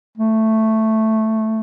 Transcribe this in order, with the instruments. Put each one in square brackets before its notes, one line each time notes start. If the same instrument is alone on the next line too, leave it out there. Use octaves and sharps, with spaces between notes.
[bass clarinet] A3